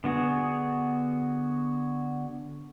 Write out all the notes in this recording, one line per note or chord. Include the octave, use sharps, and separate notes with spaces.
D3 B3 F#4 G#4